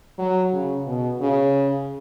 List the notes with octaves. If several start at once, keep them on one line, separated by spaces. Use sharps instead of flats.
F#3
C#3
B2
C#3